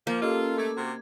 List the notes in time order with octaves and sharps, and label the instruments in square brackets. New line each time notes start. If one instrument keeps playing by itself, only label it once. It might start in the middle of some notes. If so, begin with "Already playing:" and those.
[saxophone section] F3 [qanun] A#3
[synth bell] C#4 G4 D#5 [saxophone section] F4 [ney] A4
[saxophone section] A3 [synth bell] D6 G#6
[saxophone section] C3 A#3 F#4